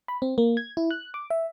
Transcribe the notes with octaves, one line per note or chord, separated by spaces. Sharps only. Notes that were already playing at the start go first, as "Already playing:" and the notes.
B5
C4
A#3
G#6
E4
F#6
D6
E5